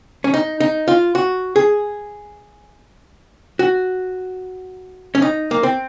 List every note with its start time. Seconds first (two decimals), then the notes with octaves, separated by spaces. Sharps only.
0.24 C#4
0.34 D#4
0.60 D#4
0.88 F4
1.15 F#4
1.56 G#4
3.59 F#4
5.15 C#4
5.22 D#4
5.51 A#3
5.63 C4